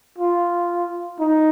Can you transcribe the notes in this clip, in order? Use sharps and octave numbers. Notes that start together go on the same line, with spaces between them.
F4
D#4